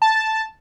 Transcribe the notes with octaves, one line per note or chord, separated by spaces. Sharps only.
A5